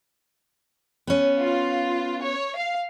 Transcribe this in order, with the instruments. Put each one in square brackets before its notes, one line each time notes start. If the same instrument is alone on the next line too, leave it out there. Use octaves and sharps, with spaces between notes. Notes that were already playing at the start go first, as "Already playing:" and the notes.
[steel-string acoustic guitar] B3 C#4
[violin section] F4
C#5
F5